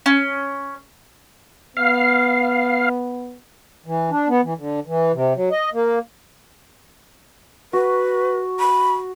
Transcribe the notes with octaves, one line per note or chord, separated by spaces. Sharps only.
C#4
B3 F5
E3
D4
B3
E3
D3
E3
C3
F#3
D#5
A#3
F#4 B4
B5